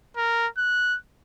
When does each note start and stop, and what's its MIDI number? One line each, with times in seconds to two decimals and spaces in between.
0.17 0.48 70
0.58 0.97 90